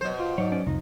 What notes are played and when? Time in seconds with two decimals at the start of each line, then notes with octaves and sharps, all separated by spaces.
0.01 B2 F#3 C5
0.19 F4
0.38 G#2 F#3 C#5 D5
0.52 C#4 D5
0.66 C2 F2 F3 D#4